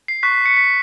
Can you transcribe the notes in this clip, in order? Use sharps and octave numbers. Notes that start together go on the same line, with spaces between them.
C7
C#6 F#6 B6
B6
B6 C#7
B6